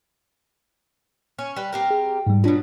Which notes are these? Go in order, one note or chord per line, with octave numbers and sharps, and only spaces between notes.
C#4
G3 B4
C4 G4 A#4
G#4
G#2 G3
B2 F#3 D4 F4